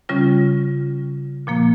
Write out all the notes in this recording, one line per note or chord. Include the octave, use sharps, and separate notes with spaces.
C#3 G3 C#4 F4
A#2 F3 A#3